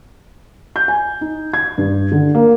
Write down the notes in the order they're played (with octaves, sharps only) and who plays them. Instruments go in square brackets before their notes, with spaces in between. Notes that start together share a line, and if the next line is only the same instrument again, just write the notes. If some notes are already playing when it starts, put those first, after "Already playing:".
[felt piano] G6
G#5
D#4
G#6
G2
D3
A#3